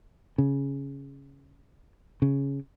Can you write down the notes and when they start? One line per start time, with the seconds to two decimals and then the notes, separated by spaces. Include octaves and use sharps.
0.38 C#3
2.22 C#3